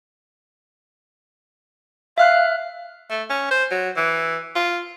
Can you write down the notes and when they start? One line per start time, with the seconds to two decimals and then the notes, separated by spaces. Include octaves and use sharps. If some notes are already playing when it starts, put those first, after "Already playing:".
2.18 E5 F5 F6 F#6
3.10 A3
3.30 C#4
3.51 C5
3.71 F#3
3.97 E3
4.55 F4